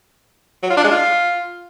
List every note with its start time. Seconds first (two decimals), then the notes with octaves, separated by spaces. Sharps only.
0.63 F#3
0.70 F4
0.77 D4
0.84 G#3
0.91 F4